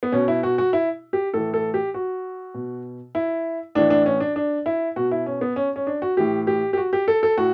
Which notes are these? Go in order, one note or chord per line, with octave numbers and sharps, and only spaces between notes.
B3
B2 C#4
E4
F#4
F#4
E4
G4
A2 E3 A4
A4
G4
F#4
B2
E4
A2 E3 D4
D4
C#4
D4
D4
E4
B2 F#4
E4
C#4
B3
C#4
C#4
D4
F#4
A2 E3 G4
G4
G4
F#4
G4
A4
A4
A2 F#4